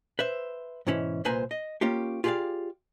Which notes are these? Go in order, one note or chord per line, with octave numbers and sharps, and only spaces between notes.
B4 C5 E5
G#2 B2 E3 C#4 E4
C2 A#2 B4 C5 G#5 A#5
D#5
A#3 C#4 F4 G4
F4 G4 G#4 C#5 D5 F5